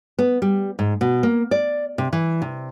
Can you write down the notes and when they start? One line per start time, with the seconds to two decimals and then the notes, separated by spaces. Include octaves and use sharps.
0.19 B3
0.42 G3
0.79 G#2
1.01 B2
1.23 A#3
1.51 D5
1.98 C3
2.13 E3
2.42 C3